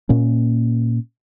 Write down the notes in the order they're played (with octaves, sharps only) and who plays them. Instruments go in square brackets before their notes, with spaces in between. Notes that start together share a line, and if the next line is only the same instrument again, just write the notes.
[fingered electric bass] A#2 A#3 C#4